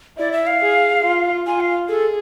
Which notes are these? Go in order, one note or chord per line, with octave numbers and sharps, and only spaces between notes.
E4 D5
E5
F5
G#4
F4
F4 G#5
F5
G#4 A4